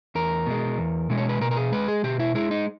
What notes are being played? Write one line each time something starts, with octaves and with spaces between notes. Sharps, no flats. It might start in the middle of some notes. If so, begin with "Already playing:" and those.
E2 A#4
B2 G#3
E2
B2 G#3
C#5
B4
B2 A#4
A#4
G#4
G#3 B4
G#4
B2 G4
E4
G#3 E4
D#4